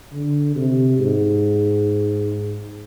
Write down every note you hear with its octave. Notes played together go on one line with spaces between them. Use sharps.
D3
C3
G#2